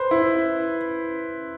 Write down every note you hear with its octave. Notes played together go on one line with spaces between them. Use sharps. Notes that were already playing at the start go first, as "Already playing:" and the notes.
Already playing: B4 C5
E4